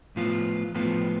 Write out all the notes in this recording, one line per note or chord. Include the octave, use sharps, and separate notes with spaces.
A2 F3 B3 F4
A2 F3 B3 F4